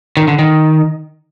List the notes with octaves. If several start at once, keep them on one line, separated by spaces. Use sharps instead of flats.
D#3
D3
D#3